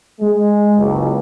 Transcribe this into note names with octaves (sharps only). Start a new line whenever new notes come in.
G#3
F#1 C#2